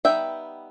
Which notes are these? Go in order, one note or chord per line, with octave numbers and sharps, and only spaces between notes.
G3 B3 D#4 E5 G5